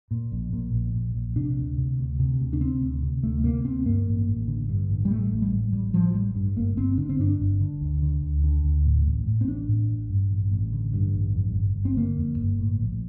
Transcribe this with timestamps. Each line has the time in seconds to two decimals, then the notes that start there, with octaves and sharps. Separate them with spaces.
0.11 A#2
0.32 A#1
0.53 A#2
0.74 A#1
0.94 A#2
1.15 A#1
1.36 C3 D4
1.57 D2
1.78 C3
1.98 D2
2.19 C3
2.40 D2
2.53 D4
2.61 C3 C4
2.81 D2
3.02 C3
3.23 D2 A3
3.44 C3 A#3
3.65 D2 C4
3.85 G2 A#3
4.06 A1
4.27 A1
4.48 D3
4.69 G2
4.90 A1
5.05 G3
5.10 A2 A3
5.32 A1
5.42 G3
5.52 A2
5.73 A1 G3
5.93 A2 F3
6.14 A1 G3
6.35 G2
6.56 G1 A#3
6.77 G1 C4
6.98 D3 D4
7.09 C4
7.19 G2 D4
7.40 G1
7.60 D3
7.81 D2
8.02 D3
8.22 D2
8.43 D3
8.65 D2
8.85 A2
9.06 A1
9.27 A2
9.41 C4
9.47 A1 D4
9.68 A2
9.89 A1
10.10 G2
10.31 A1
10.52 A1
10.72 D3
10.93 G2
11.14 A1
11.35 F2
11.56 G1
11.76 G1
11.85 C4
11.97 D3 A#3
12.18 F2
12.39 G1
12.60 A2
12.81 A#1